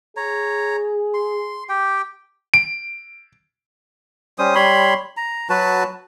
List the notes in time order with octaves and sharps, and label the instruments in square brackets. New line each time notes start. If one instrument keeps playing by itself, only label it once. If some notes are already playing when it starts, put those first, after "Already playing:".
[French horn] G#4 [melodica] C#5 A#5
[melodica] C6
G4 G5
[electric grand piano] D7
[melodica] G3 C#4 C5 D#6
G3 C#5 B5 C6
A#5
F#3 F#4 B4 A5